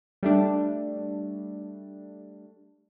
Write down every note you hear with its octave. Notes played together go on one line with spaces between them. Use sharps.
G3 A3 D4